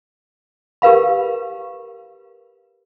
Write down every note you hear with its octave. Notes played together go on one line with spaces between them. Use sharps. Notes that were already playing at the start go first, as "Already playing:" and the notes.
G4 A#4 B4 F5 B5